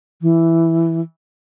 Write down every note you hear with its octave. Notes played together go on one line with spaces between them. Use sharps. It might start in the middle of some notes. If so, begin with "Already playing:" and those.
E3